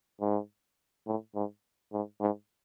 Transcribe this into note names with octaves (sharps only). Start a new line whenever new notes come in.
G#2
A2
G#2
G#2
G#2